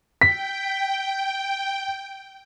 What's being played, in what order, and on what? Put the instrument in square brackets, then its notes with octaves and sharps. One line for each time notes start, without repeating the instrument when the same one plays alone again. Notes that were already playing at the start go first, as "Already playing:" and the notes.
[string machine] G5 [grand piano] B6